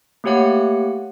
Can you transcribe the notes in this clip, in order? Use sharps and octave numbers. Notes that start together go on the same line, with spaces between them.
A3 A#3 G4 C#5 F#5 C#7